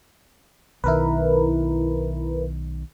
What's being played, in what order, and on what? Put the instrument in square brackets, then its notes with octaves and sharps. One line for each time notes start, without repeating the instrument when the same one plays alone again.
[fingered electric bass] B1 D#3 [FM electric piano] E4 A#4 B4